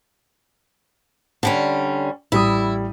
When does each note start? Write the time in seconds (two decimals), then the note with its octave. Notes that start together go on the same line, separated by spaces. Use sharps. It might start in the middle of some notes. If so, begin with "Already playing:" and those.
1.43 D3 G3 C#4
2.32 A1 G3 E4 D#6